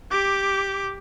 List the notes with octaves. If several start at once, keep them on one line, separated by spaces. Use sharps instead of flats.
G4 D6